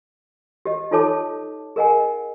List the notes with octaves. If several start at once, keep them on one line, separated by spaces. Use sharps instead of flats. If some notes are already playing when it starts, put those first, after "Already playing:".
G4 D#5
D#4 F4 A4 C#5 A5 D6
G#4 A#4 D#5 F#5 G#5